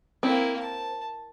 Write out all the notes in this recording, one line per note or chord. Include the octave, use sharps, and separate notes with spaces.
A#3 C4 E4
A5